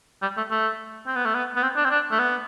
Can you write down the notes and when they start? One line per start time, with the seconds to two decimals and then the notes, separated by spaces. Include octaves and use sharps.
0.22 G3
0.37 A3
0.51 A3
1.07 C4
1.16 B3
1.25 A3
1.34 B3
1.56 B3
1.63 C4
1.77 D4
1.85 C4
1.91 D4
2.11 A3
2.19 B3